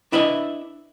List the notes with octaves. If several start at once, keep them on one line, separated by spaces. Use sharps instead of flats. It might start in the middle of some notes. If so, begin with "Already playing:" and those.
D4 E4 B4 D#5 E5